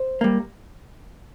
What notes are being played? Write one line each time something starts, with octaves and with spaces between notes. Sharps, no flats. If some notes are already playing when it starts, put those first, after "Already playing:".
Already playing: C5
G3 A#3